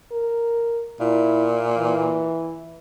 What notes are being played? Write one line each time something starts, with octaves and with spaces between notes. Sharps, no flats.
A#4
A#2 E4
E3